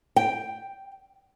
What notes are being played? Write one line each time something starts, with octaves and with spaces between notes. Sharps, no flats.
G5